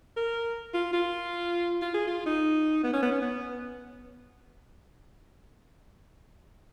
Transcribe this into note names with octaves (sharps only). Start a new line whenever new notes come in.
A#4
F4
F4
F4
G#4
F4
D#4
B3
C#4
B3
C#4
B3